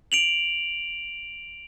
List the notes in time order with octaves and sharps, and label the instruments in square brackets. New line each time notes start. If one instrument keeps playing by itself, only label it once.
[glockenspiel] D7 F7 F#7